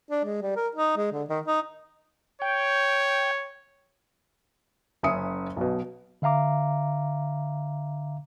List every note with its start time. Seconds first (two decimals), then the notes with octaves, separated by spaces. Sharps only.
0.10 D4
0.24 G#3
0.42 G3
0.56 A#4
0.75 D#4
0.97 G#3
1.12 D3
1.29 D#3
1.46 D#4
2.42 C#5 G5
5.03 F#1 C#4 E5 D#6 C#7
5.57 B1 B2
6.22 D3 E5 F5 A#5 D6